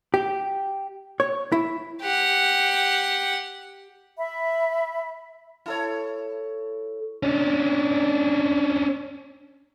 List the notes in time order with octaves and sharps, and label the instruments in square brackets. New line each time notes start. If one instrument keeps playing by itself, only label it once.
[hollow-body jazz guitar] G4
C#5
E4
[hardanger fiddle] G4 F#5
[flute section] E5 B5
[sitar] E4 A4 C#5
[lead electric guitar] C#4 D4